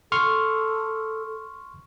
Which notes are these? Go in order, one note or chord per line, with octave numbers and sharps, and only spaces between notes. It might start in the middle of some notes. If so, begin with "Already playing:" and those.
A4 C6 C#6 F6